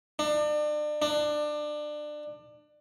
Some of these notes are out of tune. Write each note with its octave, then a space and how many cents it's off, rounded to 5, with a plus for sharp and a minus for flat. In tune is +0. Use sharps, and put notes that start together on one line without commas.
D4 +35
D4 +25